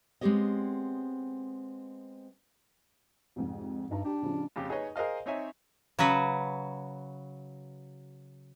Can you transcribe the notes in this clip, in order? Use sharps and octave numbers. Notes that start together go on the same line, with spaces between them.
G#3 B3 C4 G4 C#5 D#5
C2 F2 G#2
G2 D#4 A5 A#5
D4 G4
A1 C#3 F3
F2 C#3 F4 G4
D#4 G#4 B4 C#5 D#5
G#4 A#4 C5 D#5 F5
C4 D#4 C#5 E5 G#5
C#3 F#3 F#4 B4